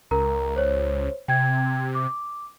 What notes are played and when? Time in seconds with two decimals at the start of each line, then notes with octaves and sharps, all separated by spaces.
0.11 C#2 A#4 A#5
0.56 C5 C#5
1.28 C3 G5 G#6
1.95 D6